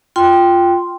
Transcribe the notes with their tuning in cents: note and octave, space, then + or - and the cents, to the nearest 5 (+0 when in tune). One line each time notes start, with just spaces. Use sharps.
F4 +0 G5 +0 C6 +0